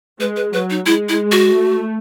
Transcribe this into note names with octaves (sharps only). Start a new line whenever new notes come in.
G#3 B4
B4
F#3 B4
D#4
G#3 E4
E4
F#4
A3